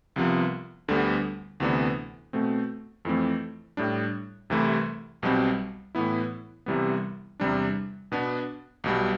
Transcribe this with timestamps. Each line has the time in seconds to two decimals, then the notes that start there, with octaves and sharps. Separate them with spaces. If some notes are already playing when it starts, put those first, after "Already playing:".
0.16 C2 C3 F3 B3
0.88 D2 D3 G3 B3
1.60 D2 C3 E3 B3 D4
2.33 B2 A3 C4
3.05 F2 E3 A3 C4
3.77 A2 G3 D4
4.50 C2 C3 E3 A3 E4
5.22 B1 B2 G3 C4
5.95 A2 E3 B3 E4
6.66 C2 C3 E3 G3 B3
7.40 E2 C3 G3 D4
8.12 B2 B3 D4
8.84 B1 B2 G3